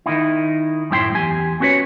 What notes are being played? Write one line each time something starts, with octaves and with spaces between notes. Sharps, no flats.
D#3 D#4 E4
F#2 A2 E4 G5 C6
E2 G4 G#5
C4 C#4 F#4 B4 C#5